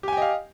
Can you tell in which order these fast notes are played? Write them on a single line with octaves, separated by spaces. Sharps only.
G4 G#5 G5 D#5 F5